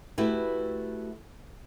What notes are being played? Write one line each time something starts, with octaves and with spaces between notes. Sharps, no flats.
A3 E4 F#4 G4 B4